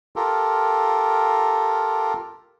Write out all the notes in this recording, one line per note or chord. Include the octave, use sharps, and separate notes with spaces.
F4 G4 A4 A#4